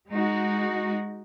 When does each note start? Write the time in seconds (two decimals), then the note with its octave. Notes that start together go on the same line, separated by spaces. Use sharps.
0.11 G#3 D#4 F#4